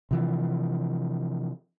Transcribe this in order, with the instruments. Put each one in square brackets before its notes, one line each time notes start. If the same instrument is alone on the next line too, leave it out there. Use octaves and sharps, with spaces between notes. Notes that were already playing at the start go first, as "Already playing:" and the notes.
[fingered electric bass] C3 E3 F3